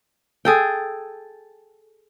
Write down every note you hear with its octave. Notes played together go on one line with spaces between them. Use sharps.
G#4 A4 G5